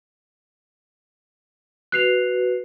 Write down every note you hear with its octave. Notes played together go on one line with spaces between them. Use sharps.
F#4 B4 F#6 C7 F7